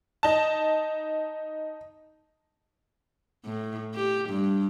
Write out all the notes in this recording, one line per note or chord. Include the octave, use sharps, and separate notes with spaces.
D#4 A5
A2
G4
G2